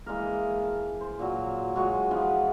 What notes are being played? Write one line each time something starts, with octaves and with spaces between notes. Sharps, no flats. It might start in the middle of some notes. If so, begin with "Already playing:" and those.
E3 G#3 A#3 A#4
A5
C5
A#2 F#3
F#3 G#3 F#4 C#6
E3 F3 B3